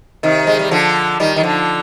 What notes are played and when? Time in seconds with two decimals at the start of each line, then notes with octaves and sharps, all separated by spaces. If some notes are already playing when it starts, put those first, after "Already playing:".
0.23 C3 D#3
0.47 G#3
0.59 G3
0.71 D3 F3
1.20 D#3 G3
1.36 D#3
1.43 D3 F3